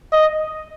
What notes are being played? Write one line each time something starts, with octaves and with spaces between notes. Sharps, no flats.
D#5